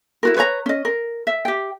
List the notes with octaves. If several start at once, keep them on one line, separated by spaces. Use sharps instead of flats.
E4 F#4 A#4
B4 C#5 D5 A#5
C#4 D#5
A#4
E5
G4 G5